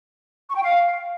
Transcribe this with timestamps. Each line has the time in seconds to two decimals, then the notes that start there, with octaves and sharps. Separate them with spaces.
0.49 C#6
0.56 G5
0.62 F5